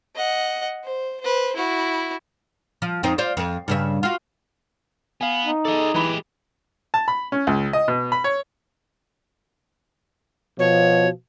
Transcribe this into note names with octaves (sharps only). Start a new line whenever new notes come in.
D#5 F#5
C5
B4 C5
E4 F#4
F3
F2 C4 D#4
F4 C5 D5
F2
G2 C#3 E5
F4 F#4
B3 F5 G#5
D#4
G#4 A4 D5 D#5
E3 G#3 G4 B5
A5
B5
C#4
C#2
D#5
B2
B5
C#5
B2 F3 C#5